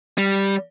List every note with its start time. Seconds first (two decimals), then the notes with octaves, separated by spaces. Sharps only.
0.18 G3